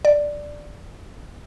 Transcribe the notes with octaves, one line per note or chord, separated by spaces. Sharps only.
D5